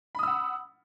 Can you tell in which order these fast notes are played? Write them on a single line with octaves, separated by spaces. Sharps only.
B5 D#6 E6 F#5